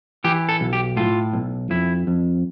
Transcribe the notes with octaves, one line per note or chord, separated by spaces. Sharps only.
E3 G4
A4
B1
G4
A2 F4
B1
F2 E4
F2